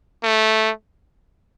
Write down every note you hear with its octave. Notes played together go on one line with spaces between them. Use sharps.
A3